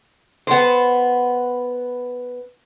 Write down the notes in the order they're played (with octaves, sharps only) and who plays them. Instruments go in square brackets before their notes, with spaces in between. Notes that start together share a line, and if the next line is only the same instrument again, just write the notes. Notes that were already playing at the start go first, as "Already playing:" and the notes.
[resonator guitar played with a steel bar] B3 C5